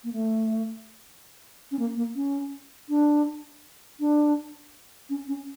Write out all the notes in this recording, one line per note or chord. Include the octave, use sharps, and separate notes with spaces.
A#3
A3
C#4
A#3
A#3
C#4
D4
D4
C#4
C#4